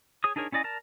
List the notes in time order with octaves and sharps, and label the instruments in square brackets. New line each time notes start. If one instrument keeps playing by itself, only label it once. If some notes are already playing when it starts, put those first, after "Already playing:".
[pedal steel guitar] G#4 C#5 D#6
D4 D#4 G#4 A#4 C#5
C#4 E4 D5 D#5 G#5
A#4 D5 A5